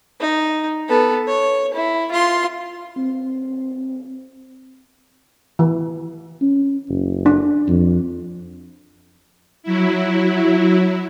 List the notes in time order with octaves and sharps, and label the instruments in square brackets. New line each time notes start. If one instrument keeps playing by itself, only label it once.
[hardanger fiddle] D#4
B3 A4
C#5
E4
F4 C6
[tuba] C4
[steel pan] E3
[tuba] C#4
F#1
[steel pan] D4
[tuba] F2
[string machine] F#3 E4